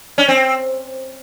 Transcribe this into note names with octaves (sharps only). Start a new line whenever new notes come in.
C#4
C4